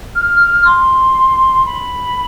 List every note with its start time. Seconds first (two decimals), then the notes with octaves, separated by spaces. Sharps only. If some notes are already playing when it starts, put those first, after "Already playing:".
0.16 F6
0.41 F6
0.65 C6
1.66 B5